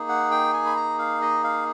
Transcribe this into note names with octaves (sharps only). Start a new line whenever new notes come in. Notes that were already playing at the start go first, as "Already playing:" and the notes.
Already playing: A#3 D#4 G#4
F#5
G5
G#5
B5
A#5
F5
D#5
F5